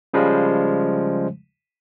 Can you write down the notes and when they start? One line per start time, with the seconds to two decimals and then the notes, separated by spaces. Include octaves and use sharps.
0.14 C#3 F3 G3 G#3